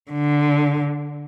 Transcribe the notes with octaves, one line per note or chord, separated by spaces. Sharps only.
D3